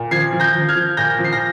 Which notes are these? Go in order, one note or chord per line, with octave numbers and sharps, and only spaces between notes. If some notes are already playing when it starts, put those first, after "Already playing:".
Already playing: A#2
F3 G#6 C7
F3
G6 A#6
F3
F6 G#6
F3
A#2 G6 A#6
F3
C7
A#6